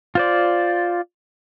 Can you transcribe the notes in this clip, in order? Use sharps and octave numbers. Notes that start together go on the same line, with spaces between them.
F4 C5 D5